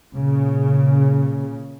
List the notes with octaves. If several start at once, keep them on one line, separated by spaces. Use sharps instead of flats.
A#2 C#3